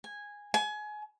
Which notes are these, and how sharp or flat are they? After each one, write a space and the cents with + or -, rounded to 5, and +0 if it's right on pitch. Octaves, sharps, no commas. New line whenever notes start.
G#5 -10
G#5 +25